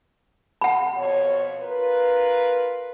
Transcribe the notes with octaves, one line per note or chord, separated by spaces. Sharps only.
F#5 B5
F2 B2 C#5
F4 A#4 B4